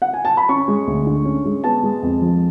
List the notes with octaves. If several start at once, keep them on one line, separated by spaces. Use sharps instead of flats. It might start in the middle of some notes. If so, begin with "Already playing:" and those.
F#5
G#5
A5
B5
C#4 C#6
G#3
D2
D3
C#4
G#3
B3 A5
G#3
F2
F3